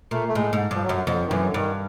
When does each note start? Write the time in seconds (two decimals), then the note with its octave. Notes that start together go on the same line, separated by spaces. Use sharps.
0.11 A#2 A3
0.28 A3
0.35 A2 G#3
0.53 G#2
0.71 G2 F3
0.83 F#3
0.89 F#2
1.07 F2
1.27 D#3
1.31 F#2 E3
1.47 D3
1.54 G2 D#3